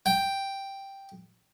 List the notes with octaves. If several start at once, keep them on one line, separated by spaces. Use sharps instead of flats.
G5